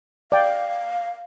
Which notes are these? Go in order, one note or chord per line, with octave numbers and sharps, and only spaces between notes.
D5 F5 G5